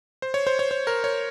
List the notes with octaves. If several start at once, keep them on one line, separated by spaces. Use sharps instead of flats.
C5
C#5
C5
C#5
C5
A#4
C#5